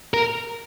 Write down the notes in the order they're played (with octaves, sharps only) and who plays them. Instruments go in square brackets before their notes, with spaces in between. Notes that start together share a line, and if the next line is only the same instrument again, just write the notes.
[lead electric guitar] A#4